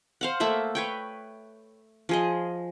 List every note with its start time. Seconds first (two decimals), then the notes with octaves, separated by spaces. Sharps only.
0.21 C5 F5 F#5
0.40 A3 A#3 E5 F#5
0.75 B4 C#5 G5
2.09 F3 G#4 D#5